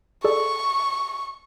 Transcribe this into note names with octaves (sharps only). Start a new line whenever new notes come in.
G#4 A4 D5 C#6